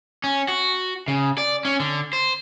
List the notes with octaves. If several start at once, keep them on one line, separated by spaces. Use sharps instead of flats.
C#4
F#4
C#3
D5
C#4
D3
C5